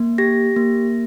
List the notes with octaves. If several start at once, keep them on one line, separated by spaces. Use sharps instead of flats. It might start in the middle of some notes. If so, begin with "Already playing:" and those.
Already playing: A#3
G4 A#6
A#3